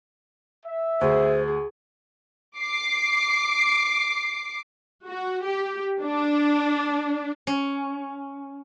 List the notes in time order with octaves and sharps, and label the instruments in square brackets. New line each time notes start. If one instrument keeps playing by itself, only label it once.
[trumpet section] E5
[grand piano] D2 [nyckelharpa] G#4 [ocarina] C5
[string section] D6 C7
[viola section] F#4
G4
D4
[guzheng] C#4